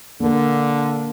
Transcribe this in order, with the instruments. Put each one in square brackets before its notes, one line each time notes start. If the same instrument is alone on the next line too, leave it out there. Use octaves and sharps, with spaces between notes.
[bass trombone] D3 [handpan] A#3 A#4